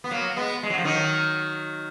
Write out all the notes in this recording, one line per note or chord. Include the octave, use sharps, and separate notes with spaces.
B3
F#3 A#3
G#3 B3
G#3
F#3
F3
D#3 F#3